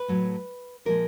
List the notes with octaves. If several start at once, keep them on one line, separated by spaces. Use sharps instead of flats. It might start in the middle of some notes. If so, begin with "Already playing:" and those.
Already playing: B4
A2 F#3 A3
A#2 F3 G#3 A#4